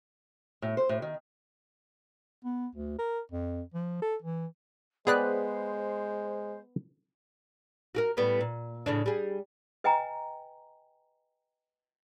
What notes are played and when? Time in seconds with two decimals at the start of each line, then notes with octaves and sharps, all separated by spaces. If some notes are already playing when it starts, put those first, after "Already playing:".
0.62 A2
0.77 C5
0.89 A2
1.02 D#3
2.45 B3
2.75 D2
2.98 A#4
3.31 F2
3.74 F3
4.02 A4
4.22 E3
5.07 G#3 B3 G#4 B4 C5 D5 G5 F#6
7.95 F#4 G4 A#4
8.17 A2 G3 B3
8.41 A#2
8.86 A2 C#3 D4
9.06 G3 G#4
9.84 B4 D#5 G5 G#5 A#5